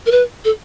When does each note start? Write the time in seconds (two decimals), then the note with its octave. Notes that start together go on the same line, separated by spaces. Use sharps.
0.06 A#4
0.11 B4
0.45 A4